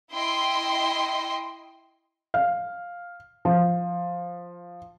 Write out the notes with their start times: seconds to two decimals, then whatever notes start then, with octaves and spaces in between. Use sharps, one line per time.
0.12 E4 D#5 G5 C6
2.34 F5
3.45 F3